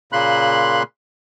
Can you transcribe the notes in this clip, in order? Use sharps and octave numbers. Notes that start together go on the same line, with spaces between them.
A#2 C#3 A#3 B5 C6 F#6